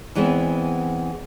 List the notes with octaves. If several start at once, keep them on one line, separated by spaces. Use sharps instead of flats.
E2 E3 G#3 B3 C4